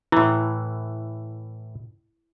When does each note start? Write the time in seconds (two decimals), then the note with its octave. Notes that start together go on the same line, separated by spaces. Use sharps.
0.12 A2 E3 E4